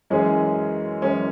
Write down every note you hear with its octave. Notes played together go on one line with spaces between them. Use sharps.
F#2 E3 G#3 C#4 G#4
F#2 E3 G#3 C#4 G#4